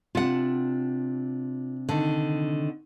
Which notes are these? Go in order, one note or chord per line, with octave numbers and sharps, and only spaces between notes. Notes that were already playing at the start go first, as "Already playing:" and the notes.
C3 D4 F4 F#5
D3 D#3